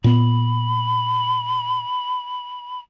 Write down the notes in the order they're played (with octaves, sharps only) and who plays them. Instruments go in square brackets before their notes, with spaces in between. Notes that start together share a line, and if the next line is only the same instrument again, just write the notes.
[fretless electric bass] A#2 B3 [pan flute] B5